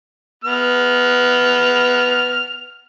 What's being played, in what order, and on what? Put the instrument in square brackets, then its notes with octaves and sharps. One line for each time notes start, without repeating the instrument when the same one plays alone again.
[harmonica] B3 F6